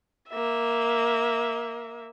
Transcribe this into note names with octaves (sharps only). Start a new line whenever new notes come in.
A#3 E5